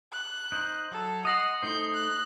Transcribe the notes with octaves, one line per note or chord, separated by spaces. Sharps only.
F#6
D#4 C5
F#3 A4
D#5 F#5 C6 D#6 A#6 F#7
A3 D#4 C5 G6
F#6